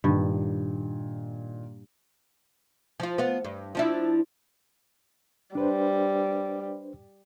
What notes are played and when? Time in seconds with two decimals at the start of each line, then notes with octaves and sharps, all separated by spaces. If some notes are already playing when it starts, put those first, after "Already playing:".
0.04 G2 A#2 D#3
3.00 F3 F4
3.18 B3 F4
3.44 G2
3.75 F3 D4 E4
5.55 G3 D4 B4 C5